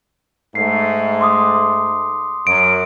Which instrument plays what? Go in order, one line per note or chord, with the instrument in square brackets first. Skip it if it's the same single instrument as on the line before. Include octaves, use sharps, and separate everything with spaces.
[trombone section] G#2 A3 [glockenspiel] C7
[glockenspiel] C6 D6 D#6
[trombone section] F#2 [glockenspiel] D7